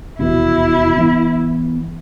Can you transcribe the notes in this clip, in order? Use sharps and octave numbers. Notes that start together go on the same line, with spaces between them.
F1 E2 B2 E4
E3 B3